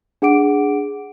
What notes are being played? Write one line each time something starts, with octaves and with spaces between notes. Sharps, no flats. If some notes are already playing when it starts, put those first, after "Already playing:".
D4 G#4 F#5 D6 D7